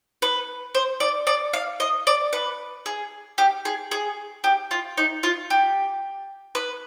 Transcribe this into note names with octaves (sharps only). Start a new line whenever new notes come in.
B4
C5
D5
D5
F5
D#5
D5
B4
G#4
G4
G#4
G#4
G4
F4
D#4
F4
G4
B4